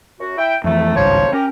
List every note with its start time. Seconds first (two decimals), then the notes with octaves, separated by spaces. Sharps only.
0.20 F#2 F#4
0.38 E4 E5 G5
0.64 F2 E3 A3
0.96 G#1 C#2 G2 F3 C5 C#5
1.33 C#4 G4 A#4